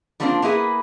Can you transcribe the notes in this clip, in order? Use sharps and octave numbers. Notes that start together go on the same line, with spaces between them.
F3 G3 A#3 C4 D4 F4
A#3 B3 E4 G#4 B4